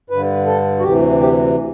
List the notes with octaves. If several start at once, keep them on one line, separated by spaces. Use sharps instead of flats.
G2 D3 B4
A4
F#4
D2 C3 E3 G4
G4